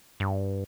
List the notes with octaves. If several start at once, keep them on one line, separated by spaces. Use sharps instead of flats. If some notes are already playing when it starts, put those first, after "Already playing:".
G2